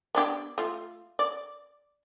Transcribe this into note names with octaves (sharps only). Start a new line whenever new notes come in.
B3 D4 G4
A3 F4
D5